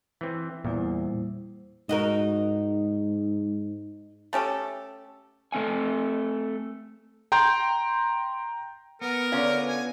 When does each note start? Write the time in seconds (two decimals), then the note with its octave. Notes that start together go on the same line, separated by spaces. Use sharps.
0.21 E3 C4
0.65 E2 A#2 G3 E4 C5
1.89 G#2 D#4 F#4 A#4
4.33 A3 C#4 G4 A4
5.52 A3 C4 F#5 G#5
7.32 G5 A#5 C6 G6
9.01 B3 A#4
9.32 D3 C#4 F4
9.68 G#5